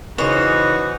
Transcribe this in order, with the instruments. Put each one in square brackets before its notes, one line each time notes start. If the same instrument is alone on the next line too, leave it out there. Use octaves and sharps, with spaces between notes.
[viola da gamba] C#3 [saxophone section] E3 D#4 [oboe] F#4 [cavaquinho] C5 C#5